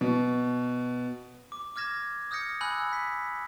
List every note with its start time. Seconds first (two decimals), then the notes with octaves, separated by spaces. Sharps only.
0.01 B2
1.52 D6
1.76 D6 F6 G#6 A#6 E7
2.31 D#6 F6 G6 A#6 C#7
2.61 G#5 B5 E6 F#6 G6 F#7
2.93 B6